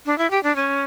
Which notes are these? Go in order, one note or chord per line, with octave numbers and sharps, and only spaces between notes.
D4
E4
G4
D4
C#4